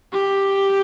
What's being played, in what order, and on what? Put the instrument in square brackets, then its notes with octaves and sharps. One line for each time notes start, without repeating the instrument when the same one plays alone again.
[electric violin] G4